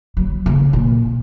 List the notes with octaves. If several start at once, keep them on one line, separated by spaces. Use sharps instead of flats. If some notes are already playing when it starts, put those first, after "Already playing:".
F#3
C#3
A#2